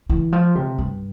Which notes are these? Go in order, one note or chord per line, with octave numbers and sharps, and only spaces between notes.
E3
F3
C3
G2